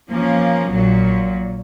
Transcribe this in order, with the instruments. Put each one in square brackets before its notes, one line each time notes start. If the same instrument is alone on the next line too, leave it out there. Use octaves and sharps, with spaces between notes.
[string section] F3 A#3 C#4
A#1 A#2 F#3